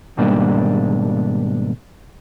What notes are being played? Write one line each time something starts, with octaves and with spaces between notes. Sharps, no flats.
D#2 G#2 B2 G3 A#3 D4